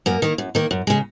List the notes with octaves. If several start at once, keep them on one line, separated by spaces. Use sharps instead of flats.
F#2 A#3
D#3 A#3
F#2
D#3 A#3
F#2
C#3 G#3